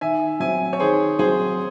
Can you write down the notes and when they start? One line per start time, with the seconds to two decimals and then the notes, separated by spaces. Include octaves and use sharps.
0.01 D#3 E5 G#5
0.40 F#3 C4 E5 G#5
0.73 C#5
0.80 D#3 G#4 C5
1.19 F#3 C4 G#4 C5